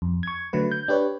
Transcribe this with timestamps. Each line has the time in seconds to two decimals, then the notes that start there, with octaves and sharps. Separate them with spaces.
0.02 F2
0.23 C#6 G#6
0.53 D3 F#3 A3 B4
0.71 G6
0.88 D4 G4 B4 C#5